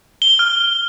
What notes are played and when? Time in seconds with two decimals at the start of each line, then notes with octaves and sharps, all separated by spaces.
0.22 G7
0.39 F6